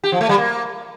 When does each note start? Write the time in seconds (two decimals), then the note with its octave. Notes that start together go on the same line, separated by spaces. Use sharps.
0.04 G4
0.12 F3
0.21 A3
0.29 G3
0.38 A#3